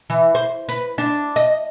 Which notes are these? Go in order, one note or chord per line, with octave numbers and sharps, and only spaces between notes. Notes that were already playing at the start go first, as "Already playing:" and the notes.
E3
C5
B4
D4
D#5